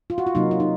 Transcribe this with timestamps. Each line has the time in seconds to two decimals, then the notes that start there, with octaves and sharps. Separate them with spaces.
0.10 F4
0.18 F#4
0.27 F4
0.35 C3 F#3 A#3 D#4
0.51 F4
0.60 D#4